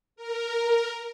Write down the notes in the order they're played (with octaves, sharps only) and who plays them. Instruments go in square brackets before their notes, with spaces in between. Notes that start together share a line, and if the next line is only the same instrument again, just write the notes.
[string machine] A#4